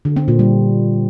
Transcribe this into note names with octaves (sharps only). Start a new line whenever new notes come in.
D3
C4
A#2
G3